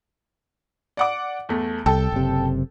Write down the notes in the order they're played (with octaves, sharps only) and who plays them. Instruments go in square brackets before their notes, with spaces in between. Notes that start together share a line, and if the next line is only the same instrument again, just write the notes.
[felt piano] D5 F#5 D6
E2 A3
[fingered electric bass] C2 [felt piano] A4 G5 A5
[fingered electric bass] F#1 C3